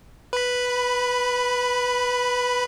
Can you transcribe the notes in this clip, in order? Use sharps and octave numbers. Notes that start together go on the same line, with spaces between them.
B4 B5